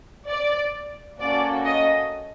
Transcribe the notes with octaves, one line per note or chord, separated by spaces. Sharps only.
D5
A#3 C#4 F#4 A4 D5
D#5